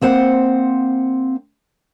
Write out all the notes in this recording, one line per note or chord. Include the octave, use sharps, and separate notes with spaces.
A#3 C4 C5 F#5